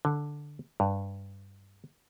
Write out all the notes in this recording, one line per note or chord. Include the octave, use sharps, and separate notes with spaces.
D3
G2